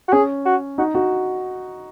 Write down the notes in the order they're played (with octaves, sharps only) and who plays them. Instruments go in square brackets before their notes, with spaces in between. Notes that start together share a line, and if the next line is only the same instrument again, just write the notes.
[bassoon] F#4
[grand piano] C#4 [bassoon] G#4
[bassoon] F#4
[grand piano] D#4 [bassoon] F#4
[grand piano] F#4